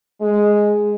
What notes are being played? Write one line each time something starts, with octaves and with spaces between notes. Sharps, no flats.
G#3